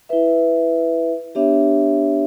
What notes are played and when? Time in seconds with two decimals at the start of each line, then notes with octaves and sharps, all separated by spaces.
0.09 E4 B4 E5
1.35 B3 D4 G4 C#5 E5